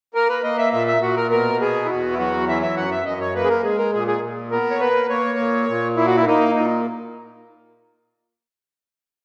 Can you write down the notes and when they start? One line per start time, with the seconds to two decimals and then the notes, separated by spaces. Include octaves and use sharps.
0.14 A#3 A#4
0.29 B4
0.44 A#3 D#5
0.58 E5
0.73 A#2 E5
0.87 E5
1.02 A#2 F#4
1.17 A#4
1.31 B2 A#4
1.60 B3 G#4
1.85 E4
1.89 E2 F#4
2.13 E4
2.18 F#3 F#4
2.48 E3 E5
2.62 E5
2.77 F#2 F#5
2.91 E5
3.06 F#2 D#5
3.21 C#5
3.34 A#3 B4
3.44 G#4
3.49 A#4
3.64 G#3 G#4
3.78 A#4
3.94 A#2 G#4
4.07 G#4
4.22 A#2
4.52 B3 A#4
4.70 C#5
4.80 A#3 B4
5.09 A#3 C#5
5.38 A#2
5.69 A#2
5.97 A#3 E4
6.07 F#4
6.16 E4
6.26 A#3 D#4
6.55 A#2 D#4